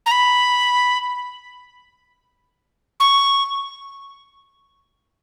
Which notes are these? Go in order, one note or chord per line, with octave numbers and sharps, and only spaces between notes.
A#5
B5
C#6